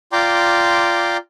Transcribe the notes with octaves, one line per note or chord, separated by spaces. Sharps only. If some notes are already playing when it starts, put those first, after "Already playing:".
F4 D5 G5 A#5 C6 D6